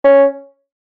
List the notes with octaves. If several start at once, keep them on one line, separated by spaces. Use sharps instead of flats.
C#4